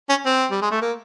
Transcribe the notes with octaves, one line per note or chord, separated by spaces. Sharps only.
C#4
C4
G3
G#3
A3
A#3